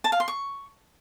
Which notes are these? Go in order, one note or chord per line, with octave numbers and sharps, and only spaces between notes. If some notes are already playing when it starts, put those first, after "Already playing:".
A5
F5
C6
C#6